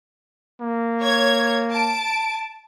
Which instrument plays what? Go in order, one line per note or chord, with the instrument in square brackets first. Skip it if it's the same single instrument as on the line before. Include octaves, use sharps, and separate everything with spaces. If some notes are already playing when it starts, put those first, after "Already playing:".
[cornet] A#3
[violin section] C#5 G#6
A5 D7